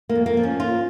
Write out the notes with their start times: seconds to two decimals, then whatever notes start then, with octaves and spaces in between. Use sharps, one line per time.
0.09 A#3
0.15 F2
0.26 A#3
0.37 F3
0.43 C#4
0.60 A#3 F4